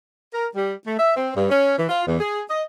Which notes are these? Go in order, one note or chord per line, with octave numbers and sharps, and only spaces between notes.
A#4
G3
A3
E5
C4
G2
C#4
E3
F4
E2
G#4
D#5